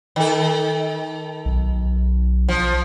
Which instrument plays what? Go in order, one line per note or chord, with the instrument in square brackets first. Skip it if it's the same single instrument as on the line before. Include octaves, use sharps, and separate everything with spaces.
[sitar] D#3 A4
[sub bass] B1
[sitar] F3